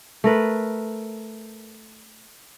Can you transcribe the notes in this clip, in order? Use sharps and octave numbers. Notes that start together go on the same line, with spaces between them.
A3 A#4 B4